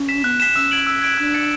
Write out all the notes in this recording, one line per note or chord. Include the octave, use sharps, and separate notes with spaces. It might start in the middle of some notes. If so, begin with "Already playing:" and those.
Already playing: C#4
B6 E7
B3 F#6
B6 E7
C#4 E6
G#6 D7 F#7
E6
G#6 D7 F#7
D4 F#6
A6 C#7 E7